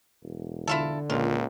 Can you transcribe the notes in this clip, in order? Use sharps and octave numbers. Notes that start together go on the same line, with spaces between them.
E1
D3 E4 F4 A4
C#2 A#2 F4